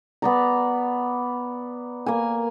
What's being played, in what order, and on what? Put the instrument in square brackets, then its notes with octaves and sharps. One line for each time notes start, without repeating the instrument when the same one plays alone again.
[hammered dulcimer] B3 D5 A#5
A#3 G#5